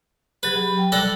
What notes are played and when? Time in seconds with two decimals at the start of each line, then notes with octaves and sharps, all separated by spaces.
0.43 F#3 G4 G#4 B4
0.55 F#3 B5
0.77 G5
0.92 G3 A4 D5 F#5